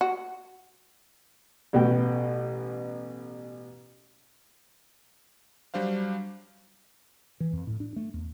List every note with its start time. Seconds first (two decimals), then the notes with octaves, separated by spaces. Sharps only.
0.01 F#4
1.73 A1 B2 G5
5.74 F#3 G3 D4 C5 F5
7.40 E3
7.53 F2
7.67 A2
7.80 D4
7.96 A3
8.14 E2